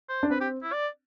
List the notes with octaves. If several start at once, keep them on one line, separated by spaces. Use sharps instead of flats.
C5
D4
C4 B4
G4
E4
D5